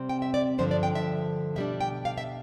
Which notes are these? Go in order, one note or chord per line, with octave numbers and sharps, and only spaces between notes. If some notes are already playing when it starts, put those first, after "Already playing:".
Already playing: C3 G3 C4
G5
E5
D5
G2 D3 F3 C5
D5
G5
E5
B2 G3 D4 E5
G5
F5
E5